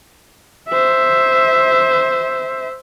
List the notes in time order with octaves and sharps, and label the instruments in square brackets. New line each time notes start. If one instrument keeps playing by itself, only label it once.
[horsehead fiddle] C5 E5